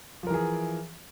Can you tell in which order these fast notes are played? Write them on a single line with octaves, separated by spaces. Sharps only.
F3 A#4 E3 G#4